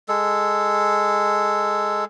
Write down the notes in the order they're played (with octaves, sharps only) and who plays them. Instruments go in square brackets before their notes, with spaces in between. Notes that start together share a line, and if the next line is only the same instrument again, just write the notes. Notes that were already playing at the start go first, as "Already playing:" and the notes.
[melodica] G#3 A4